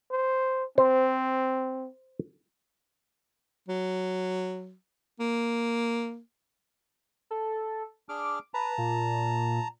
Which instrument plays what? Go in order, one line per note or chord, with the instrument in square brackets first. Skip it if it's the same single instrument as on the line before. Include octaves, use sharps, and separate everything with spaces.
[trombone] C5
[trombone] C4 [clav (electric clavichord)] C5
[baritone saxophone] F#3
A#3
[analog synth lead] A4
[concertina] D4 G#4 F6 [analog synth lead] D6
[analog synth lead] B4 [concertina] A5 A#5
[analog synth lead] A#2